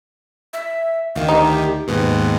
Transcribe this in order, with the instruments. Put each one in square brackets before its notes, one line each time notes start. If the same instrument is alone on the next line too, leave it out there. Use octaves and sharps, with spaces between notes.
[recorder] E5
[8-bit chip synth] D2 D#3 [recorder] F5
[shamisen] D#4 [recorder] G4
[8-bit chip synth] D#2 G#2 B2 [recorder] B4